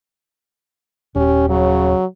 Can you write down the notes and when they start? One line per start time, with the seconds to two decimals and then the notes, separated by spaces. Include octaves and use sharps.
1.15 D#1 C#4 G4
1.49 C#3 F#3